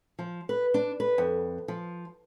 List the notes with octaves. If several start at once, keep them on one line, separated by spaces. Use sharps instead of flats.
F3
B4
D4
B4
F2
F3